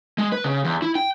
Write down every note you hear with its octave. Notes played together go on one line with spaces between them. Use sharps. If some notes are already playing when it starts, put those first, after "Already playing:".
G#3
B4
C#3
E2
E4
G5